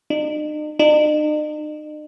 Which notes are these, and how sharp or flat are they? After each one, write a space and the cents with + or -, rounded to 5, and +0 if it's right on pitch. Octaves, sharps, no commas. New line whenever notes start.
D#4 -45
D#4 -45